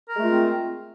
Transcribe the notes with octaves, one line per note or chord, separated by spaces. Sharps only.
G#3 A3 C4 F4 A#4